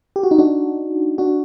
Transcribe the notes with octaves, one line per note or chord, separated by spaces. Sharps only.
G4
F#4
D#4
D4 F#4
D4 F#4